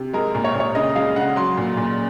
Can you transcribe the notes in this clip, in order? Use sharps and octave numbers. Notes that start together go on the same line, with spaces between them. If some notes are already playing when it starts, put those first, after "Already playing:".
Already playing: C3
G#3 A#4
A#2
C#5
A#2
C#5
C#3 D#5
G#3 F5
C#3 F#5
F#3 C6
A#2
A#2